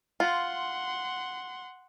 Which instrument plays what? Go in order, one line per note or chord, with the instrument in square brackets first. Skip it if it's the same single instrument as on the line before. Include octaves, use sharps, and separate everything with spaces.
[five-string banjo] F4 [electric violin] F#5 C6